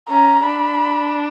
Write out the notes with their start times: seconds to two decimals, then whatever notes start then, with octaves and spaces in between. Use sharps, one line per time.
0.09 C#4 A#5
0.43 D4 B5